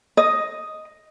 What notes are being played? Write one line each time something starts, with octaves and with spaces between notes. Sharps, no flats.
D#5